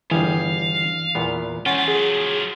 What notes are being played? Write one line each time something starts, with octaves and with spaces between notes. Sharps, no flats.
G1 E3 G3 G#4 F5
E2 A#2 B3
F#3 C#4 F4 F#5
G#4